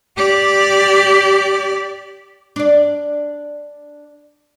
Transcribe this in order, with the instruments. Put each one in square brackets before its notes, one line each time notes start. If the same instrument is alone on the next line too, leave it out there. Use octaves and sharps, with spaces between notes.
[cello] G4 D5
[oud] D4 D5